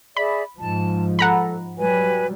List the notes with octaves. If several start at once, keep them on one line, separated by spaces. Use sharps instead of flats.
G#4 D5 E5 B5
G#2 F3 A5
A4 F#5 A#5 B5
F#3 G3 B4 G#5